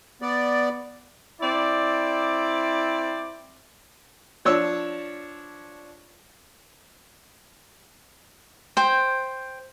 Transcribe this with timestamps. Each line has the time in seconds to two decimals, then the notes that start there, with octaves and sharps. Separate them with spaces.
0.22 B3 D5
1.41 C4 E4 D5
4.45 F3 D4 C#5 E6
8.77 C5 G5